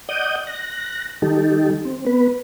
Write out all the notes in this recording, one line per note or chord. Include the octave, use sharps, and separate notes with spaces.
D5 D#5 F#5 D#6 G6
F#6 A#6
D#3 G3 D#4 G4 A4
C4
B3 B4